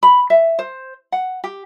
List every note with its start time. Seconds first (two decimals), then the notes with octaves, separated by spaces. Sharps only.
0.03 B5
0.30 E5
0.59 C5
1.12 F#5
1.44 G4